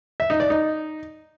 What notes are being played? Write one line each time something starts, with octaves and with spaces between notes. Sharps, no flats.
E5
D#4
D5
D#4